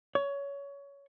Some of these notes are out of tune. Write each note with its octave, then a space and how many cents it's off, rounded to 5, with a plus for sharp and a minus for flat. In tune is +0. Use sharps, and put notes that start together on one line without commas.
C#5 +20